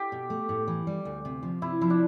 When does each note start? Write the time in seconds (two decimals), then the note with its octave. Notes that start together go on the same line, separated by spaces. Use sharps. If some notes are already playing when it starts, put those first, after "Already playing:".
Already playing: G4 A4
0.12 B2
0.30 A3
0.49 A2
0.67 E3
0.87 G3
1.05 D2
1.25 C3
1.43 F3
1.62 C3 E4
1.81 F3 E4
1.90 D4